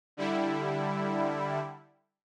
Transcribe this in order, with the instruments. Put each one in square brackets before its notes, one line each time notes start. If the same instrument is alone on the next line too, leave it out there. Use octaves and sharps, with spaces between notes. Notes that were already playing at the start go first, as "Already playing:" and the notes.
[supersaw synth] D3 G3 E4